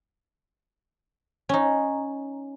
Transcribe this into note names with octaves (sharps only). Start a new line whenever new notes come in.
C#4 D#4